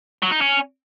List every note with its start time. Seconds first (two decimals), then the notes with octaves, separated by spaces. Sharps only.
0.22 F#3
0.32 D#4
0.41 C#4